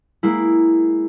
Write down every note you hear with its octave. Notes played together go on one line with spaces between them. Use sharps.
G#3 A#3 E4